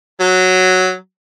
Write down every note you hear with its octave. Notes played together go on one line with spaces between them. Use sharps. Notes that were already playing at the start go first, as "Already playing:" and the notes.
F#3